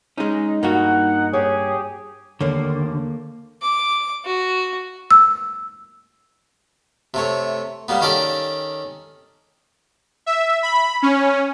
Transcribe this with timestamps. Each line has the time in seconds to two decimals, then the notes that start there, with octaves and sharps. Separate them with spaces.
0.18 G#3 C#4 D#4
0.63 G2 A#3 F#4 F#5
1.33 G4 G#4 C#5
2.41 D#2 D3 A3 A#3 C#5
3.62 D6
4.25 F#4
5.11 E6
7.14 C3 A3 C#5
7.88 G3 A#3 B3
8.01 D#3 C#4 G4 A4 D5
10.26 E5
10.63 B5
11.02 C#4